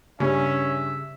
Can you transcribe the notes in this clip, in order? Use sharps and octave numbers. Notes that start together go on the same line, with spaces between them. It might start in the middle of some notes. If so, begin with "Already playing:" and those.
G2 C#3 C#4 E5